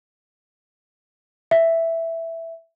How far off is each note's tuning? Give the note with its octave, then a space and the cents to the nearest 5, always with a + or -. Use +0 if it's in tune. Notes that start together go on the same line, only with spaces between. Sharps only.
E5 +5